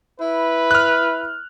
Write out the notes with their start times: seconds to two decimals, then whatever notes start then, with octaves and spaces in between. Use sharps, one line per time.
0.20 E4 B4
0.71 F6 F#6